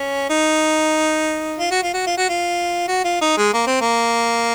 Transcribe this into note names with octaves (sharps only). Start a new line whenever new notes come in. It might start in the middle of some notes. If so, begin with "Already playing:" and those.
Already playing: C#4
D#4
F4
F#4
F4
F#4
F4
F#4
F4
F#4
F4
D#4
G#3
A#3
C4
A#3